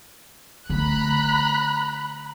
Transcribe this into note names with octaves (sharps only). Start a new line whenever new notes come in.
D3 A3 A#5 B5 F#6